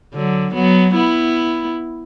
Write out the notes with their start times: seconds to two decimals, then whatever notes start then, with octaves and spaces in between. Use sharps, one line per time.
0.14 D3 F#3
0.54 F#3 B3
0.95 B3 E4